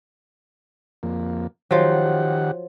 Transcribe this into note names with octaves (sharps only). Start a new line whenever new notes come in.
F2 A#3
D#3 F3 F#3 G4 F#5